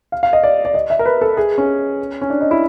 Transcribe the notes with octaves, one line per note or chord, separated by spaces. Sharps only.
F5
F5
D#5
D5
D5
D#5
E5
A#4
B4
A4
G#4
C#4
C#4
D4
D#4
E4